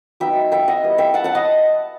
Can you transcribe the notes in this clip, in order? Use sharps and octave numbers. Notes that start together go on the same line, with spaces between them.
F#3 B3 D#4 E5 G5
E5 G5
D#5 F#5
G3 B3 E4
E5 G5
F#5 A5
F#5 A5
D#5 F#5